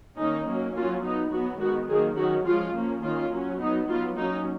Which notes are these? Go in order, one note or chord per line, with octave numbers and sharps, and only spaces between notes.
D#3 A#3 C#4 D#4
F#3 A#3 C#4
F#3 A#3 C#4 F4
F#3 B3 D#4
F#3 B3 F#4
D#3 G#3 B3 F#4
D#3 F#3 A#3 G#4
D#3 F#3 C#4 F#4
F3 G#3 C#4 F4
F3 A#3 C#4
D#3 A#3 C#4 F4
F#3 C#4
F#3 B3 D#4
F#3 B3 F4
F#3 A#3 C#4 D#4